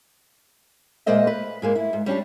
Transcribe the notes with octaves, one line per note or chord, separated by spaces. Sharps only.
A#2 G#3 A#3 C5 D#5 E5
B4
G#2 G#3 A#3
E4
G#2
G3 C#4 D4 G4